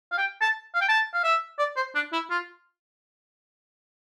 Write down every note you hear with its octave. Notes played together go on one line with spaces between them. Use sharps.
F5
G5
A5
F5
G5
A5
F5
E5
D5
C5
D4
E4
F4